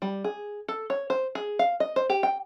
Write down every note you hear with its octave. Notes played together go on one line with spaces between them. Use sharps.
G3
G#4
A4
C#5
C5
G#4
F5
D#5
C5
G4
G5